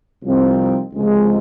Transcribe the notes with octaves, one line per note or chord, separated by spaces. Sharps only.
C2 C3 F3 C4 D#4
C#2 C3 F3 G#3